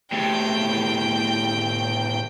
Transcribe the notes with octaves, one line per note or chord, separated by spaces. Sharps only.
A2 C3 G5